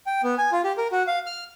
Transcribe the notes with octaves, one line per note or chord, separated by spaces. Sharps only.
G5
B3
G#5
F4
G4
A#4
F#4
F5
F6